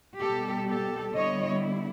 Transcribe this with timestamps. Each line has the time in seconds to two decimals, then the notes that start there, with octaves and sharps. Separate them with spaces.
0.21 B2 G3 B3 G4 A4
0.68 G4 A4
1.15 D3 G3 B3 E4 C#5 D#5